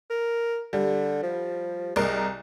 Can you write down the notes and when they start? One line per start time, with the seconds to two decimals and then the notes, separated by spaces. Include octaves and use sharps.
0.10 A#4
0.73 D3 G3
1.23 F3
1.96 C2 G#3 A#4